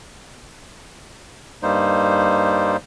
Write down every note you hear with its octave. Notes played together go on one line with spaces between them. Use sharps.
G2 G3 A#3 D#4 C5